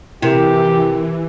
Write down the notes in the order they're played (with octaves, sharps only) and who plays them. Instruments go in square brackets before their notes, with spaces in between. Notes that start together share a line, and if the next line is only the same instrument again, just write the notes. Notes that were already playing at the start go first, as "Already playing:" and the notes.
[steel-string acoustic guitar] C3 [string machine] E3 [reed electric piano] E4 A#4 [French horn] G4